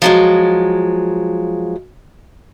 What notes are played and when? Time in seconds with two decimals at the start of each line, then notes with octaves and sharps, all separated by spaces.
0.02 F3 F#3 G#3